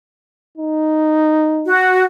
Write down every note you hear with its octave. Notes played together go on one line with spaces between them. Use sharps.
D#4
F#4